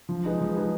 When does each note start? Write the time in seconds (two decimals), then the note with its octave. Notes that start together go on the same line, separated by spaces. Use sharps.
0.09 F3
0.25 G#3 D#4 G#4 B4
0.41 F3
0.56 G#3 D#4 G#4 B4